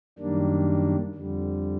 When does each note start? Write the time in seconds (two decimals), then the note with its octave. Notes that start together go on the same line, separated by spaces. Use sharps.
0.19 F#2 D#3 G3 A#3 D4
1.15 F2 D3 G3